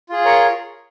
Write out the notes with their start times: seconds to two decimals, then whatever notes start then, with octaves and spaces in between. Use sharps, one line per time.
0.09 F4 G#4
0.25 A#4 C#5